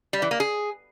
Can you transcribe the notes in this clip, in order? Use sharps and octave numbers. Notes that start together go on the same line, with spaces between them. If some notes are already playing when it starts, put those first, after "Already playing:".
G3
E3
A#3
G#4